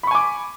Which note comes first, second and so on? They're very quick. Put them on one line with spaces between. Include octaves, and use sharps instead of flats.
B5 C#6 G#5 D6